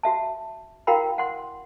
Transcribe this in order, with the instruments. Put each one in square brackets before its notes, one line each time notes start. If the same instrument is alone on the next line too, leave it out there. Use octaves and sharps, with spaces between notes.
[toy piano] F#4 E5 A5
E4 F#4 A#4 F5 G5 B5
F#5 C6